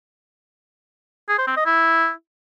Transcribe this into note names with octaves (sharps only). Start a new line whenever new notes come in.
G#4
C5
C4
D#5
E4